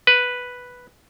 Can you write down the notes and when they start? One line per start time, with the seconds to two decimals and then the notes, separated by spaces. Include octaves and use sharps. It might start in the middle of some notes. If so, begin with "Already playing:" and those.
0.07 B4